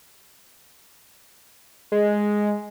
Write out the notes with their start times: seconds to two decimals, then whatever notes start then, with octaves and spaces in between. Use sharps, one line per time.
1.92 G#3